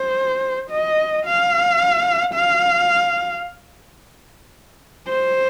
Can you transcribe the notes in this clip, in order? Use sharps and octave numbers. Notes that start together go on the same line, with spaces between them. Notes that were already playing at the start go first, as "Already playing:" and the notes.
Already playing: C5
D#5
F5
F5
C5